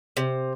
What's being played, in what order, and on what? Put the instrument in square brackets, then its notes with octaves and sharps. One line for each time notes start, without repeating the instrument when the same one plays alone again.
[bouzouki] C3